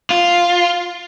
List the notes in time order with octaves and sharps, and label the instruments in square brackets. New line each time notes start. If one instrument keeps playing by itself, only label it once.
[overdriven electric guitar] F4